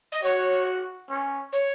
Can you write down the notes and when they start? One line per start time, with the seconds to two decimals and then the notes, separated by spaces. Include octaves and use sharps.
0.12 D#5
0.23 F#4 C#5
1.09 C#4
1.52 C#5